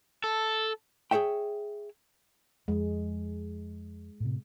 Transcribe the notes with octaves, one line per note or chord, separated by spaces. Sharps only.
A4
G#4 A4 C#5 E5 G5
F2 G#3
A2 C3